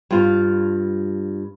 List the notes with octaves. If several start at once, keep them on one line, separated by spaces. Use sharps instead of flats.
G2 F4